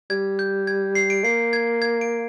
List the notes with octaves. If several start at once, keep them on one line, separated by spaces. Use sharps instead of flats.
G3 G#6
G6
G#6
C7
D7
A#3 C7
G#6
G#6
D7